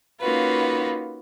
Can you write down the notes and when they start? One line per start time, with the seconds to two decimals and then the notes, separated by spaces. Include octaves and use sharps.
0.21 A#3 C#4 D#4 F4 F#4 B4